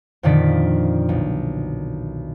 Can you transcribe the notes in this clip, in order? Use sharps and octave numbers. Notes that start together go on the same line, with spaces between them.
F2 A#2 D3 D#3 D5 B6
B1